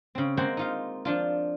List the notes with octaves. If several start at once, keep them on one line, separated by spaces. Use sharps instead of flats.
C#3 C4
G#3 A#3 C4 C5 F#5 G5
D#4 F4 F5
F3 D4 F4